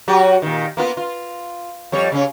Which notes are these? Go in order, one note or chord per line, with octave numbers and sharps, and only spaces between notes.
F#3 F#4 G4
A#2 D#3
A#3 B3 F4
F4
F2 G3 C#5
C#3 C#4